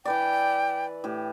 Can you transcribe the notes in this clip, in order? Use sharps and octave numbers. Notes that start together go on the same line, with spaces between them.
E3 B4 D5 G5
A2 G4